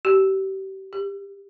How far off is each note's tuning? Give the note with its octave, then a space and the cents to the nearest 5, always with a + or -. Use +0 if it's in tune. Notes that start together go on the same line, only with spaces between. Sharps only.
G4 -30
G4 +20